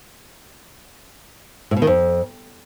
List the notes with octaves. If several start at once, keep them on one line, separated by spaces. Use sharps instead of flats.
A2
B2
D#3
F2